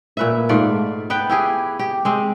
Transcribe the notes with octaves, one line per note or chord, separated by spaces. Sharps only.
A#2 B4 E5
G#2 A3 F4 D5
B3 B4 G5
E4 G4 G#4
G4
G#3 C4